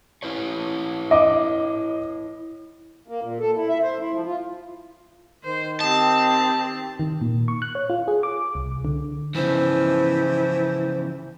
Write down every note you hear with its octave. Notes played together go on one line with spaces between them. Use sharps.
E4 B4 C#5
D#5 D6
A#3
A#2
A4
E4
E5
C5
E4
F3
F4
D#3 C5
C4 G4 D#5 A5
D#3
A#2
C#6
F#6
C#5
F4
G#4
D6
C2
D3
C#3 E3 F3 C5